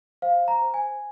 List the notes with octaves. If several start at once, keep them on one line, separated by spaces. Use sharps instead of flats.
C5 F5
A#5
C5
G#5